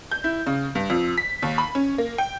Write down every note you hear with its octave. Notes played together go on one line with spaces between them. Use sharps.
G6
E4
C#3
G2
F2
B6
D#2
B5
C#4
A#3
G5